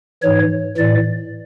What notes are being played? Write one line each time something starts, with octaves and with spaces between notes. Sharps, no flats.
G#2 E3 C#5
A2 E3 D5